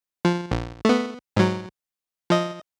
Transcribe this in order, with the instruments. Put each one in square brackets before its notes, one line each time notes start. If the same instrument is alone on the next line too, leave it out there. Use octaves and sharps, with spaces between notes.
[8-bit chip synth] F3
A#1
A3 B3
G#2 F#3
F3 D#5